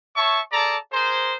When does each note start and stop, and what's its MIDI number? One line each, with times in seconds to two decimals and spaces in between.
0.17 0.41 73
0.17 0.41 76
0.17 0.41 81
0.17 0.41 85
0.52 0.77 68
0.52 0.77 69
0.52 0.77 74
0.52 0.77 81
0.52 0.77 82
0.92 1.35 68
0.92 1.35 70
0.92 1.35 72